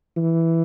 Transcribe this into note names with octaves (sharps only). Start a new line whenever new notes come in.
E3